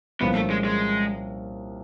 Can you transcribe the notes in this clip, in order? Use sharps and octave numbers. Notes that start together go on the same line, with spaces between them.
C2 A#2 F3 A#3 B3 C#4
A3
G#3
G#3